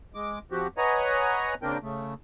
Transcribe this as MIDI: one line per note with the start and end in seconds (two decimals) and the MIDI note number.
0.14 0.39 56
0.14 0.39 86
0.52 0.67 53
0.52 0.67 60
0.52 0.67 66
0.52 0.67 67
0.78 1.54 71
0.78 1.54 73
0.78 1.54 75
0.78 1.54 78
0.78 1.54 80
0.78 1.54 82
1.62 1.78 49
1.62 1.78 58
1.62 1.78 60
1.62 1.78 62
1.62 1.78 70
1.62 1.78 79
1.82 2.14 49
1.82 2.14 57